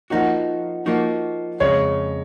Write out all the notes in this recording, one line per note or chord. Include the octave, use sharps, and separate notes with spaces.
F3 A#3 D#4 F#4 F#5
F3 A#3 D#4 F#4
F2 C#3 G#3 C#5